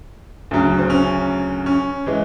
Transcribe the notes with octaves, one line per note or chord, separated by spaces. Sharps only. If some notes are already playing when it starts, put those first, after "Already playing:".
D2 C#3 F#3
C4
C#4
C#4
E3 G#3